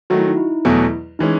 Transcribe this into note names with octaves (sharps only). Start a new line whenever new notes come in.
D#3 F#3 A3 F#4
E4
D#4
E4
E2 B2 F#3 A3
E3 G#3 C#4 D#4